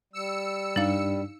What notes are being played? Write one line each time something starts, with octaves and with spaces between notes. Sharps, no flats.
G3 E6 C#7
G2 D4 D#4 F5